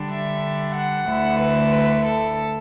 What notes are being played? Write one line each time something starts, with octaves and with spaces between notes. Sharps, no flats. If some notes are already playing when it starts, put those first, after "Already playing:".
Already playing: D3 G3 D4
E5
F#5
D2 D3 A3 E4
B4
B4
A4